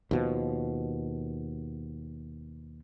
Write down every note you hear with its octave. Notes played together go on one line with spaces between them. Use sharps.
D#2 B2 F3